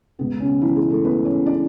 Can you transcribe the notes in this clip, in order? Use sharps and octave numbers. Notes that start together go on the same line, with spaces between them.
C#2 B2 G#3 B3
C#3 C#4
E3 E4
G#3 G#4
A3 A4
B3 B4
C#4 C#5
D4 D5